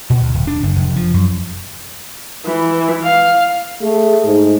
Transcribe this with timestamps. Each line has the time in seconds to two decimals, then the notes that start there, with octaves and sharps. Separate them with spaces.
0.10 A#2
0.21 D2
0.34 D1
0.47 D4
0.63 F#1
0.76 F1
0.96 F3
1.14 F#2
2.46 E3
3.04 F5
3.82 A3 G#4
4.25 G#2